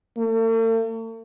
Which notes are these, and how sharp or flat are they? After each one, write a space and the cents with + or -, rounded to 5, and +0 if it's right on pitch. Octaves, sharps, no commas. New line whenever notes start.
A3 +45